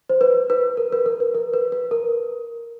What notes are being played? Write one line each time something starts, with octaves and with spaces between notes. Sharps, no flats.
C5
B4
B4
A#4
B4
A#4
B4
A#4
B4
B4
A#4